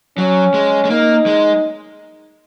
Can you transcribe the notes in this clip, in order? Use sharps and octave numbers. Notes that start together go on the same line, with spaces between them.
F#3 C#4
G#3
G#3
A#3 D#4
G#3